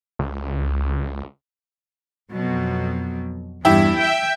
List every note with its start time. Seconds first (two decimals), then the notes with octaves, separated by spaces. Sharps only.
0.19 C#2
2.33 F2 B2 F#3
3.65 E2 G2 E4 G4
4.00 E5 G5 G6